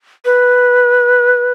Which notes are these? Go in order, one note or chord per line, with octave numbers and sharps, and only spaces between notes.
B4